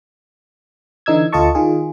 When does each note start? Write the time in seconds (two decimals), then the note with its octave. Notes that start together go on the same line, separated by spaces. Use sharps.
1.06 D3 E3 D#4 E6 G#6
1.32 D2 F4 A4 D#5 A5 C#6
1.55 D#3 F4 G#4